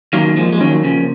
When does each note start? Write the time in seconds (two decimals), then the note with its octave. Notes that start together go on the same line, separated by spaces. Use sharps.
0.13 D#3 F#3 A#3
0.37 F3 G#3
0.53 G#3
0.61 D#3 F#3 C#4
0.84 C#3 F3